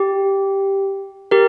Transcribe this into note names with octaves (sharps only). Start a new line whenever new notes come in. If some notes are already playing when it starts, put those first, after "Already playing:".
Already playing: G4
G4 A#4